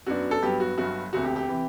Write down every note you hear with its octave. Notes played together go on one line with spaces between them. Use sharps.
F#2 F#3 B3 D4 F#4
A4
G2 F#3 B3 G4
F#4
G1 G2 F#3 F#4
E1 D2 C3 F#4
G4
G4
C3 E3